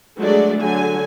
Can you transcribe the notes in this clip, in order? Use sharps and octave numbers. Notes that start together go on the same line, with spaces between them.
F#3 G#3 A3 D4 G#4 D5
D3 F#3 G#5